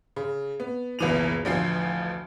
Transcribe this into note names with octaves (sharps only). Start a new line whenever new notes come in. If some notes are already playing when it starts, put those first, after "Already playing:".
C#3
B3
F#1 C#2 B2 E3 D#7 F7
A1 D2 F3 C7